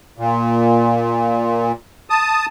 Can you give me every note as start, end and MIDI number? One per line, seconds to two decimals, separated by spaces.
0.18 1.72 46
2.10 2.46 81
2.10 2.46 87